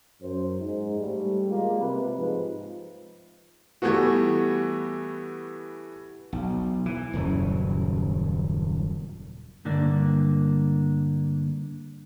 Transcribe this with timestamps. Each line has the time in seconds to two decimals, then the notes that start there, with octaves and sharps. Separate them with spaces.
0.21 F#2 C5
0.60 G#2 G#3
1.00 A1 G3 A3
1.48 G3 G#3 A#3 F4
1.79 C3 B4
2.16 G#2 F3 G#3
3.82 E3 G3 A3 B3 F#4
6.33 B1
6.86 E3
7.13 D#1 F#2 C#3 F#3
9.65 G2 D3 A#3 D4